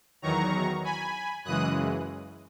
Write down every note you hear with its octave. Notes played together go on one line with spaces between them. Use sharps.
E2 D#3 F#3 A#5 C#6
G#5 B5
F#2 C#3 E3 G#3 D#6 F#6